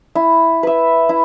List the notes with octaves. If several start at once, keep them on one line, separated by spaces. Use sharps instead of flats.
E4
B4 E5
E4